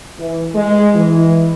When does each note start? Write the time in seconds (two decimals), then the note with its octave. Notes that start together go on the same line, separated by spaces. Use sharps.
0.19 E3
0.55 G#3
0.95 E3